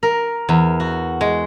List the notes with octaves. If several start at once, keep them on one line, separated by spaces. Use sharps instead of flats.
A#4
E2
F#4
G#3